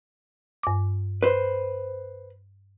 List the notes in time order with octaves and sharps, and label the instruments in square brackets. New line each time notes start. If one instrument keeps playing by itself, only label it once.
[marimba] G2 D6
[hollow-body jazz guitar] B4 C5